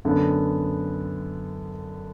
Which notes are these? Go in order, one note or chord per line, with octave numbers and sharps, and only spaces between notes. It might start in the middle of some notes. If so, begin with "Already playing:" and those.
F#2 D3 B3